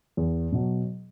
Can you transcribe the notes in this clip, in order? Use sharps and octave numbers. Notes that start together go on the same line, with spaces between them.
E2
B2 F#3